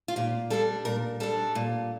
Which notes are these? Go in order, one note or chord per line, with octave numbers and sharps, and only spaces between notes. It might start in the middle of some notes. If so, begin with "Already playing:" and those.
F4
A#2 G4
G3 D4 A4
A#2 A#4
G3 D4 A4
A#2